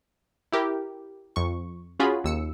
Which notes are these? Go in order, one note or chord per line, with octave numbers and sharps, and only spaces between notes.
E4 G4 A#4
F2 C#6
C#4 F4 F#4 G#4 B5
D#2 E6 C#7